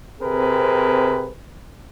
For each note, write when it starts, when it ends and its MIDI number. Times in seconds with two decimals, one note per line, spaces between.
0.21 1.31 48
0.21 1.31 60
0.21 1.31 68
0.21 1.31 70
0.21 1.31 71